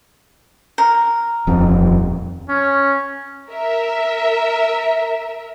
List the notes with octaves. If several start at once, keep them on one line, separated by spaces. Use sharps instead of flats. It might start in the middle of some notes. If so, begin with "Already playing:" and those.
A#4
D#1 F2
C#4
A#4 E5